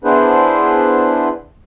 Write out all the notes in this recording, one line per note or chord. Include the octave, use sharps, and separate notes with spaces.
B3 D4 E4 G#4 B4 C5